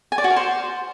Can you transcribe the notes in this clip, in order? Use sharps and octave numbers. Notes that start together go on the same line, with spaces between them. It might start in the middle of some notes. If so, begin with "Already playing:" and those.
G#5
D5
F#4
A#4
C5